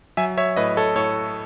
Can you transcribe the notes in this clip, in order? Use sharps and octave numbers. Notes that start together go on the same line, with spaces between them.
F#3 E5 G#5
C#5 E5
A2 B4 D#5
A4 C#5
A2 A4 C#5